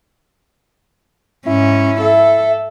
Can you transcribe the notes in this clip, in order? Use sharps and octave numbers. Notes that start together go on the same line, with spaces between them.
G#2 C#4 E4
A4 E5